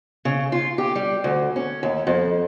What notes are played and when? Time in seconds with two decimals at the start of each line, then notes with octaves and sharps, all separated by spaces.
0.25 C#3
0.52 F4
0.78 G4
0.95 G3
1.24 D2
1.56 C#4
1.83 D#2
2.07 F2